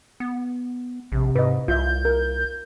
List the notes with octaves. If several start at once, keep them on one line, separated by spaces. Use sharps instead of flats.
B3
A#1 C3
G#2 B4 D#5
C2 F4 E5 G6
A#4